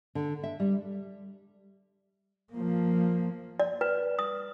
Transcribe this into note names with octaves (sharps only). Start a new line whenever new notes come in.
D3
E5
G3
F3 A#3
D5
B4
D#6